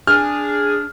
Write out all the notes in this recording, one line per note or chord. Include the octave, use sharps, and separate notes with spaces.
D4 G#4 F6